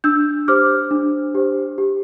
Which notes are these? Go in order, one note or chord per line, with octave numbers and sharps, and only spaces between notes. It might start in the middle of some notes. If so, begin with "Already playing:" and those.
D4 E6 G6
G4 C5 D6 F6
D4
G4 C5
G4